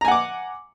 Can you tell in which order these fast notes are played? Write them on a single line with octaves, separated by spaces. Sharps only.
A#5 G#5 F#5 D6